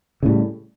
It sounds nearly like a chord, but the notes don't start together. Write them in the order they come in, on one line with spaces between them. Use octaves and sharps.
C#3 A2 G3